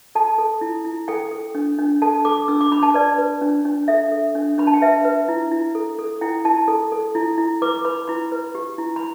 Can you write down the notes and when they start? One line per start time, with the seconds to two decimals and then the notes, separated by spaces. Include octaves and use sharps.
0.15 A4 A5
0.38 A4
0.61 E4
0.85 E4
1.08 A4 G5
1.31 A4
1.55 D4
1.79 D4
2.02 A4 A5
2.25 A4 D6
2.48 D4 E6
2.61 D6
2.71 D4 B5
2.83 A5
2.94 B4 D5
3.18 B4
3.41 D4
3.65 D4
3.88 A4 E5
4.12 A4
4.35 D4
4.58 D4 B5
4.67 A5
4.74 G5
4.82 B4 E5
5.05 B4
5.28 E4
5.51 E4
5.75 A4
5.99 A4
6.21 E4 G5
6.45 E4 A5
6.68 A4
6.92 A4
7.15 E4
7.38 E4
7.62 B4 D6
7.85 B4 B5
8.08 E4 B5
8.32 B4
8.55 G4
8.78 E4
8.96 B5